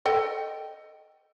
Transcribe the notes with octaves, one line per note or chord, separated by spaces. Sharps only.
A4 D#5 G5